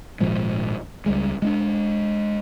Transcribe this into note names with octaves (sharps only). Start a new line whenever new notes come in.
G#1 A#2 F3 G#3
C#2 G3 G#3
G#3 C#4 D4